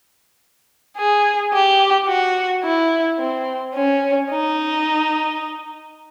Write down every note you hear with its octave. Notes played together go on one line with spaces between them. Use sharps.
G#4
G4
F#4
E4
C4
C#4
D#4